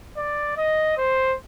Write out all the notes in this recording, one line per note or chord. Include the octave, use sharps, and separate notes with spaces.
D5
D#5
C5